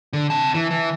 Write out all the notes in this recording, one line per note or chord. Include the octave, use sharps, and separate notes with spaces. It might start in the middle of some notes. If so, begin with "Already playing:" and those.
D3
C3 A5
E3
E3